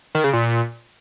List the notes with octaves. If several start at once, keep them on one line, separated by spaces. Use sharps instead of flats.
D#3
C#3
A#2